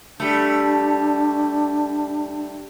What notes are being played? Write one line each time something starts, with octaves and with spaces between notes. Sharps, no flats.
G3 A3 D4